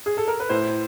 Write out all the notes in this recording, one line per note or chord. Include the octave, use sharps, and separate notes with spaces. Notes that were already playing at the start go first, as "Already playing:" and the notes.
G#4
A4
A#4
B4
A2 C5